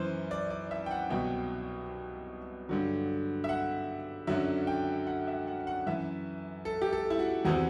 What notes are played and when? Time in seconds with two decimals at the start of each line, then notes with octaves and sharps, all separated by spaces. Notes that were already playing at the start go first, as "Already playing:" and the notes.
Already playing: F#2 E3 C5
0.31 D5
0.50 D5
0.71 E5
0.86 G5
0.91 F#5
1.10 C2 B2 F#3 G5
2.69 G2 D3 F#3
3.44 E5
3.49 F#5
4.27 F#2 D3 F#3 E5
4.67 G5
5.07 F#5
5.27 E5
5.47 F#5
5.67 F#5
5.86 F#2 E3 E5
6.65 A4
6.82 G4
6.93 A4
7.10 E4
7.19 F#4
7.45 E2 C3 E3 F#4